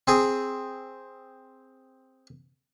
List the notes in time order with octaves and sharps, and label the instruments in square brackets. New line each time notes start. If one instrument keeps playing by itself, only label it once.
[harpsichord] C4 G#4